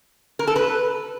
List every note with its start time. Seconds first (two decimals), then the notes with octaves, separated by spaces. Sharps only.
0.39 A#4
0.47 A4
0.56 B4